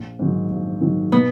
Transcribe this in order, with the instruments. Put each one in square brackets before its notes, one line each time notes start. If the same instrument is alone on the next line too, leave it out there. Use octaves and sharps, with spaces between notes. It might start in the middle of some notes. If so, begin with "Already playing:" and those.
Already playing: [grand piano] A#1
G#2 D#3 F#3
A#1
G#2 D#3 F#3
[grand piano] B2 [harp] B3